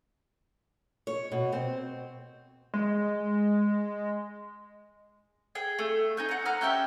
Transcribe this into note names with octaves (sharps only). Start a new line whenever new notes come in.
C#5
B2
C4
G#3
G#4 G5
A3
D#4 G#5 G6
F#5 A#5
B4 F#5 A#5 F6
C#4 G4 E5 G5